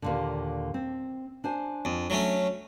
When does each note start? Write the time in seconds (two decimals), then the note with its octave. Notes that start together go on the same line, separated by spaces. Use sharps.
0.02 D#2 A#2 D3
0.74 C4
1.44 D4 C5 G#5
1.85 F2
2.10 F#3 A3 C#4